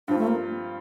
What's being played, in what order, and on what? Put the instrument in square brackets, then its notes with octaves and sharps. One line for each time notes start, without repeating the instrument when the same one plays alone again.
[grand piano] G2 F3 C4 F4 [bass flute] D4
[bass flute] A3
A#3